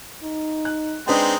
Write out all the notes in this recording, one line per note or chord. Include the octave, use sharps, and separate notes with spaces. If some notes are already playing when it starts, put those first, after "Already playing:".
D#4
F#6
G#3 C4 D4 D#4 B4 G5